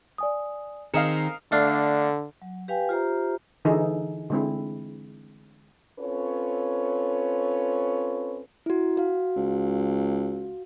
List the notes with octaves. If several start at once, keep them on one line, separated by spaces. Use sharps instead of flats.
D5 G#5 D#6
D#3 C4 G#4 A#4 D#5 F5 C#7 E7
D3 A3 D4 F5
F#3
G4 B4 F5 G5 G#5
F4 G4 C5 E5 A#5
D3 E3 D#4 G#4 A4
D3 G#3 C4 E4
C4 C#4 F4 A4 B4 C#5
E4 F#4
F#4 F5
C#2